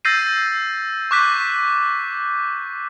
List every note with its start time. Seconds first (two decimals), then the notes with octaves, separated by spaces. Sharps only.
0.05 E6 G6 A6 A#6 C7 D#7
1.11 C#6 D6 F#6 G6 B6